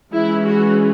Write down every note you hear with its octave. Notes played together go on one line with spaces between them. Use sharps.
E3 G#3 C#4 E4
F#4